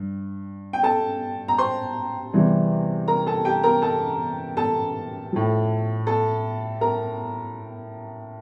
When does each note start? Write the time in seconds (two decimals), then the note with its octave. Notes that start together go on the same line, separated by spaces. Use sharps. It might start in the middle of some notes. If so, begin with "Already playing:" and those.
Already playing: G2
0.73 G5
0.83 A4 A5
1.48 A#5
1.58 C5 C6
2.33 E2 C3 E3 G3
3.08 A#4 A#5
3.26 A4 A5
3.45 G4 G5
3.63 A#4 A#5
3.82 A4 A5
4.57 A4 A5
5.32 A2 F3
6.07 A4 A5
6.81 A#4 A#5